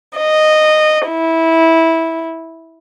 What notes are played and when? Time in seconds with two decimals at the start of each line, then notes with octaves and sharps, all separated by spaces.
0.17 D#5
1.08 E4